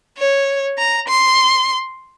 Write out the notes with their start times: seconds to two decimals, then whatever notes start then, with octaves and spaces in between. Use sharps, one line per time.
0.18 C#5
0.78 A#5
1.08 C6